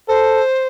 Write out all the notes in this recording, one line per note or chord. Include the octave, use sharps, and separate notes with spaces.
A4 C5